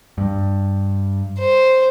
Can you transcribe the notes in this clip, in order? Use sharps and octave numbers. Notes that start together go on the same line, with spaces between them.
G2
C5